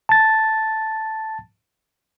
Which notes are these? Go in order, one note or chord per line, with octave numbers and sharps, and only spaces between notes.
A5 A6